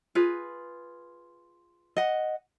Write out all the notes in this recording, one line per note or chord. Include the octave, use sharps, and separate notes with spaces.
F4 G#4 B4
D#5 F#5